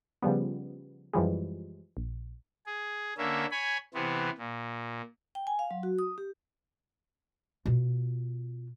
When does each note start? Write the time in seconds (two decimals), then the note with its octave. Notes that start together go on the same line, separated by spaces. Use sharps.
0.22 C#3 F3 G3 B3
1.13 F#2 E3 F3 G3 G#3
1.97 A#1
2.66 G#4
3.18 D3 A#3 C#4 E5
3.51 C#5 G#5 B5
3.94 C3 E3 B3 C4
4.38 A#2
5.35 G5
5.47 G#5
5.59 F5
5.71 F#3
5.83 F#4
5.99 D#6
6.18 G4
7.66 B2 F4